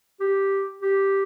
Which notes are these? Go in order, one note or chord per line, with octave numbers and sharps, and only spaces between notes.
G4
G4